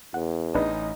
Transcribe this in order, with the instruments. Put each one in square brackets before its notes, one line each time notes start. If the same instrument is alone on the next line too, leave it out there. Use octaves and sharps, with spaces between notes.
[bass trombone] E2 [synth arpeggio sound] F#5
[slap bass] A1 [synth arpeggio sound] D4 B4 [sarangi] D#4